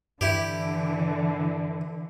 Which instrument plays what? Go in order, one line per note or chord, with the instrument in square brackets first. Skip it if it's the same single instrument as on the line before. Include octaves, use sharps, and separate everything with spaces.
[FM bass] G2 [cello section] D3 E3 [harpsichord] E4 G4